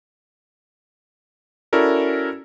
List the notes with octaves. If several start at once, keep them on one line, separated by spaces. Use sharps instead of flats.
C#4 E4 F#4 A4 A#4 D5